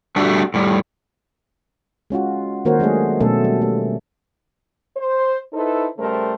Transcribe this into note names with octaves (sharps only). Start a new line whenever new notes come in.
G3 A3 D4 F#4
A2 G3
G#3 C#4 F4 F#4
D#3 A#3 F#4 A#4 C5 C#5
F#3 G#3 A3 D4 G#4
B2 F#3 A3 C#4 A4
G3
A3
C5
D#4 E4 A4 B4 C5
C#3 G3 A3 A#4 C5